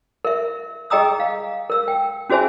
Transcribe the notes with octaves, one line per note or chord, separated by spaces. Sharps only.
A#4 E5
G#4 D#5 G5 A#5 D#6 E6
F5
A#4 E6
G5
C#4 F#4 G#4 C5 E5 G#5